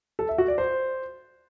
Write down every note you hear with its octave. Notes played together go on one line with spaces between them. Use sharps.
A4
E5
F#4
D5
C5